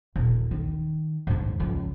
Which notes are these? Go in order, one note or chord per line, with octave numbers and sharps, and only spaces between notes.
D#1
D#3
D#2 G#2
C#2 F3